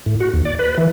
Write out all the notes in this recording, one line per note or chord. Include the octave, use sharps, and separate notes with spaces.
A2
F#4
D#2
D5
B4
E3